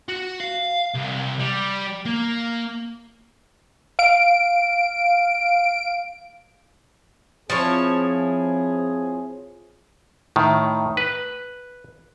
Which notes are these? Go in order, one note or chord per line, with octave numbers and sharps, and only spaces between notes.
F#4
F5
C2
G3
A#3
F5 D7
F3 C4 E4 G#4 C#5
A2 D#3
B4